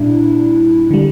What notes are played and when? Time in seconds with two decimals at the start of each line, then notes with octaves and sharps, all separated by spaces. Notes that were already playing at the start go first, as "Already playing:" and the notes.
Already playing: A#2 G3 D4 E4
0.91 D3 G3